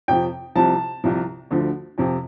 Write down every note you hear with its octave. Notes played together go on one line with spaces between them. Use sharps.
F2 C3 F3 G5
C2 C3 F3 A5
C2 C3 F3
D2 D3 F3
F2 C3 F3